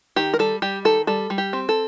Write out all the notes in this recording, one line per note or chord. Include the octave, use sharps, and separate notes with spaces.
D#3 G4
A#4
G3 A4
G3 G4
D#3 A4
G3 A4
G3
G4
C4
A4